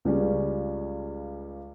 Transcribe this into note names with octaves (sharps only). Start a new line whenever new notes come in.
C#2 C#3 G3 C#4